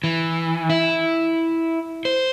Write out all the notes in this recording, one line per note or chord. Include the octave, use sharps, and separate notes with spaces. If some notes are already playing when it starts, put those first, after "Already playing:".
E3
E4
C5